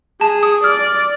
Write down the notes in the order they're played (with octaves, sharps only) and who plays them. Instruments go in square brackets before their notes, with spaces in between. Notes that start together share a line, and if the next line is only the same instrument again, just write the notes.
[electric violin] G#4 [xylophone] A5
[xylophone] D#6
[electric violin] D5 [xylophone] F6